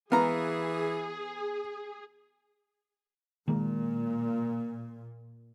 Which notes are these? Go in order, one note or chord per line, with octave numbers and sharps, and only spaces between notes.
E3 B3 G#4 F5 A#5
A#2 D#3 G#3 A#3